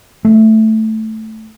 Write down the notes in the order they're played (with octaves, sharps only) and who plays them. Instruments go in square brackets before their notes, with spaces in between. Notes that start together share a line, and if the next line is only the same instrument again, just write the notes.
[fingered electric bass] A3